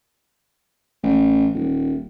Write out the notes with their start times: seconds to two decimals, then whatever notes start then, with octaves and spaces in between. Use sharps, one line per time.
1.03 A1
1.54 D#1